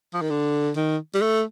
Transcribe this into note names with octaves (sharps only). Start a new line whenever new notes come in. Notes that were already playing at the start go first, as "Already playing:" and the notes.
F3
D#3
D3
D#3
G3
A3